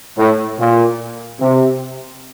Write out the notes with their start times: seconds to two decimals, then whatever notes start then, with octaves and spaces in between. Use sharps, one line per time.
0.17 A2
0.59 A#2
1.40 C3